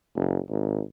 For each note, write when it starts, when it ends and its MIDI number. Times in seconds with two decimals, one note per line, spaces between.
0.16 0.38 30
0.49 0.81 32